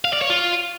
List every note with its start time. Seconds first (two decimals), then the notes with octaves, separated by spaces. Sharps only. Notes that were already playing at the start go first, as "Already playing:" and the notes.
0.05 F5
0.13 D5
0.21 C#5
0.30 F4